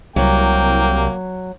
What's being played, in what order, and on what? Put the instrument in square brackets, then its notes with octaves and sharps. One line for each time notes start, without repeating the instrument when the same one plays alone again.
[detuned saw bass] C2 [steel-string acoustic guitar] F#3 [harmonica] A#3 G5